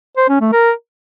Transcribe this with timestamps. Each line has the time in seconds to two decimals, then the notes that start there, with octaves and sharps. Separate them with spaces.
0.17 C5
0.29 C#4
0.41 A3
0.53 A#4